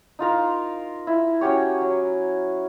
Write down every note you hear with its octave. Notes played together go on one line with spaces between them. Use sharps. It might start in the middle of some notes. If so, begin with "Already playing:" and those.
D#4 F4 A#4 F5
E4
C#4 F#4 G4 C#5
F#3